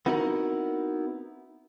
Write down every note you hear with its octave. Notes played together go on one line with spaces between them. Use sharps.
B3 C4 D#4 E4 F#4 A#4